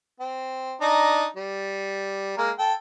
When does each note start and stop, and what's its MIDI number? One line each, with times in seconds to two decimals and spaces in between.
0.20 0.74 60
0.81 1.25 62
0.81 1.25 63
0.81 1.25 82
1.37 2.34 55
2.38 2.51 56
2.38 2.51 58
2.38 2.51 70
2.59 2.73 69
2.59 2.73 79